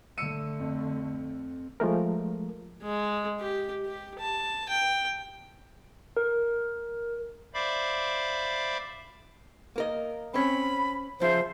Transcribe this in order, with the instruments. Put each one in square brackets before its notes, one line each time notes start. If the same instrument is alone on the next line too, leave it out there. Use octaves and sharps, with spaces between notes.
[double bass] D3 A3 [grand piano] E6 C#7 D#7
[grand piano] F2
[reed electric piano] F3 G#3 A3 A#4
[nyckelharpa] G#3
G4
G4
A5
G5
[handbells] A#4
[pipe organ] C5 D5 E5 F5 B5 D6
[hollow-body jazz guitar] A#3 A#4 D#5
[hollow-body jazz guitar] C4 C#4 [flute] B5
[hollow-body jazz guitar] C#3 F3 E5 [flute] C5